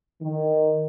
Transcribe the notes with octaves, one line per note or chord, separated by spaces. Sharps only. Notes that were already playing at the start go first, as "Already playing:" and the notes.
D#3